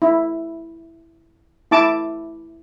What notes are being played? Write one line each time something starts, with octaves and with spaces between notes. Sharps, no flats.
E4
E4 A5 D6